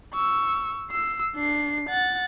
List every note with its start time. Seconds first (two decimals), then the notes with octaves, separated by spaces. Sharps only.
0.14 C#6 E6
0.91 E6 C7
1.35 D4 C7
1.89 F#5 A6